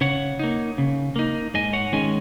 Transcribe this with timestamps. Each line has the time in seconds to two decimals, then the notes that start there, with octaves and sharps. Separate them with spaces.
0.01 C#3 C#5 F#5
0.39 A#3 D#4
0.78 C#3
1.16 A#3 D#4
1.54 G#2 D#5 G#5
1.73 C#5 F#5
1.92 D#3 G#3 C#4 D#5 G#5